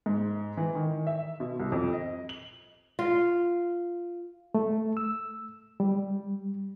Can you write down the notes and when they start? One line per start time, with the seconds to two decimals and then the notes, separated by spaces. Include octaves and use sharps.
0.06 G#2
0.57 E3
0.75 D#3
1.07 E5
1.40 B2
1.59 C2
1.72 F2
1.93 D#5
2.29 F#7
2.99 F4
4.54 A3
4.97 E6
5.80 G3